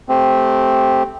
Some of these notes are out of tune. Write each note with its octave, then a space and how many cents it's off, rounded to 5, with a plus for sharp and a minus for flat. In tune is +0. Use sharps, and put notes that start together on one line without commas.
A3 -15 C4 +0 G4 +0